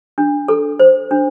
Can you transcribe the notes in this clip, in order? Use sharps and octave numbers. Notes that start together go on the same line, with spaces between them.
D4
A4
C5
D4